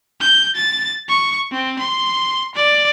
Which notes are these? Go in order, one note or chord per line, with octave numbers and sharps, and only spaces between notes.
G6
A6
C#6
C4
C6
D5